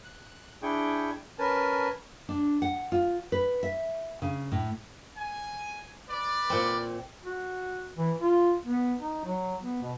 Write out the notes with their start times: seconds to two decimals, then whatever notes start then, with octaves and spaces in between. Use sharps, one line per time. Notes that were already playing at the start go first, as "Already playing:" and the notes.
0.04 F#6
0.62 D4 E4 G#4 G5 C#6
1.39 C#4 A#4 B4 G#5 A5
2.29 D4
2.62 F#5
2.92 F4
3.32 B4
3.63 E5
4.22 C#3
4.52 A2
5.17 G#5
6.08 B4 D5
6.50 A#2 C4
7.25 F#4
7.97 E3
8.20 F4
8.66 B3
9.00 D#4
9.25 F#3
9.63 B3
9.82 B2